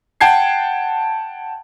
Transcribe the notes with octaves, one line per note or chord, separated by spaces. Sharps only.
F#5 G5 A5 G#6 C7